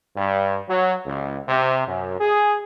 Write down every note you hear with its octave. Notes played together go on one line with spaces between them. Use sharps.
G2
F#3
C#2
C3
F#2
G#4